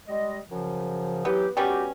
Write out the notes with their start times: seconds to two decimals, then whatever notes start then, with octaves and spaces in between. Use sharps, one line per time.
0.08 G3 G#3 D#5
0.48 F#2 C#3 F3
1.25 E3 F#3 B3 G4
1.57 G3 B3 C#4 F#4 G4